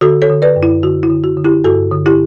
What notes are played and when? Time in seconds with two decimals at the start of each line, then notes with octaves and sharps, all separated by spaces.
0.01 D3 F#4 A4
0.22 A4 C#5
0.29 D3
0.42 B4 D5
0.56 F#2
0.63 E4
0.83 D3 F#4
1.03 E4
1.10 D3
1.24 F#4
1.37 D3
1.45 E4 G4
1.64 G2 F#4 A4
1.91 D3
2.06 E4 G4